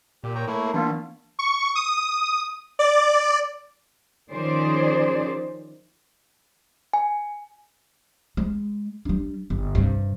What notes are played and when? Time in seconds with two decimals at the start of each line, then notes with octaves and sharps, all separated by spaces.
0.24 A#2 G4
0.35 C#5 G5 A#5
0.47 A3 A#3 E4 C#5
0.74 E3 A#3 B3 D4 F4
1.39 C#6
1.75 D#6
2.79 D5
4.31 D#3 F3 C#4 G#4 C5 D5
6.93 G#5
8.37 G#3
9.05 G3 D4
9.50 G1
9.75 G2 C3